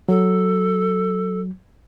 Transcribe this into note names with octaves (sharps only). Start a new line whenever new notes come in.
F#3 A4